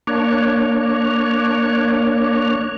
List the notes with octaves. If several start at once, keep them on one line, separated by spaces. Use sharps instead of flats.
A#3 D4 C#5